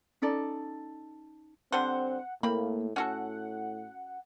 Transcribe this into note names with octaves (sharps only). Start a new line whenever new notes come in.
C#4 D#4 A4 D5
D3 G3 C4 C5 F#5
A2 A#3 C4 B5
A2 C#4 F#4 A4 F#5